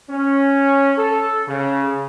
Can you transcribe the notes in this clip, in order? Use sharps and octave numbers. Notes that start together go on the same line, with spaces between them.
C#4
A4
C#3